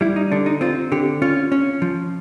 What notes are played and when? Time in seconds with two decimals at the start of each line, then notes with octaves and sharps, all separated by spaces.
0.01 G3 E4
0.16 D#4
0.32 D3 D4
0.46 D#4
0.61 C4 F4
0.92 D3 G4
1.22 C#4 F4
1.52 C#4
1.82 F3